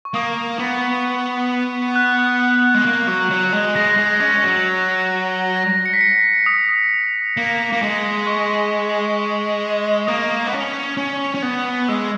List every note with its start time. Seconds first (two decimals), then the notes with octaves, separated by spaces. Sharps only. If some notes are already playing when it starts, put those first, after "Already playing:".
0.05 C#6
0.14 A#3 D#6
0.59 B3
1.96 F#6
2.74 G#3
2.86 A#3
3.07 F#3
3.30 F#3
3.52 G#3
3.75 G#3 A#6
3.98 G#3
4.20 C#4
4.43 F#3
5.56 A#6
5.86 C#7
5.93 B6
6.01 C#7
6.46 D#6
7.37 A#3
7.73 A#3
7.82 G#3
8.27 C#6
10.07 A#3 D#6
10.47 B3
10.53 C#4
10.97 C#4
11.35 C#4
11.42 B3
11.89 G#3 E6